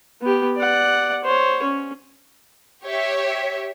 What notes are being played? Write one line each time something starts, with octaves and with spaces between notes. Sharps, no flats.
B3 G4
D5 F#5
C5 C#5
C#4
G4 C#5 E5